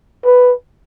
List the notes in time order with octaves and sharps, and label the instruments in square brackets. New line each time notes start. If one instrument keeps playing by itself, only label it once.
[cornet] B4